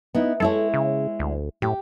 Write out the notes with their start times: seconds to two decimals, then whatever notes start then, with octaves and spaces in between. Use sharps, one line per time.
0.14 B3 D#4 E4
0.40 G#3 E4 A4 C#5
0.74 C#3
1.19 D2
1.62 A2 G4